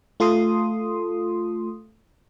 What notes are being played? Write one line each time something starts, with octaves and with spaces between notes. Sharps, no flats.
A3 F4 A4 C6 D#6